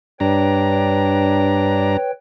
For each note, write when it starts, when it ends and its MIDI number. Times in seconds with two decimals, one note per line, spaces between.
0.20 1.97 43
0.20 1.97 62
0.20 2.11 71
0.20 2.11 73
0.20 2.11 79
0.20 1.97 82